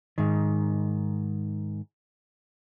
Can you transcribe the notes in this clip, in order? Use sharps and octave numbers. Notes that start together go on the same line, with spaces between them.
G#2 D#3